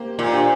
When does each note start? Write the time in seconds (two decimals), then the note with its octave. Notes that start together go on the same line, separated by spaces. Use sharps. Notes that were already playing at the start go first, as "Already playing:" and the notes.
Already playing: A#3 G4 C5
0.19 A#2
0.32 D4 G4 C5